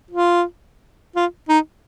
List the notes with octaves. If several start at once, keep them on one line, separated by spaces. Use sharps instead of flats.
F4
F4
D#4